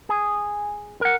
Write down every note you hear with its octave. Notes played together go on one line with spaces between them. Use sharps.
G#4
A#4 F#5